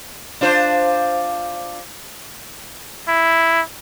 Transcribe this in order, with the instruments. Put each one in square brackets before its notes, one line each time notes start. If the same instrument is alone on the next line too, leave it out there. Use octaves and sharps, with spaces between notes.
[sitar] D4 F4 C5
[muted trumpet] E4